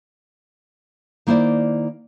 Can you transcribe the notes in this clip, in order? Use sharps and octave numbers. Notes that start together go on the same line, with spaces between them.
D#3 A#3 E4 C5 D5